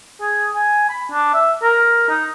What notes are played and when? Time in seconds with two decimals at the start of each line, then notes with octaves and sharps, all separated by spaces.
0.21 G#4
0.55 G#5
0.90 B5
1.12 D4
1.34 E5
1.63 A#4
2.10 D#4